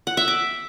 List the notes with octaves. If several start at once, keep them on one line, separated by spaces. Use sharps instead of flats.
F#5
E5
D6